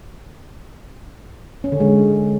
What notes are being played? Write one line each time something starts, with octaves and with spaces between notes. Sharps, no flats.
C#4
D3
G#3